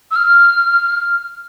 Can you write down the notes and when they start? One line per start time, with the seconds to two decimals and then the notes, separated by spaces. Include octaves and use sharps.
0.11 E6
0.16 F6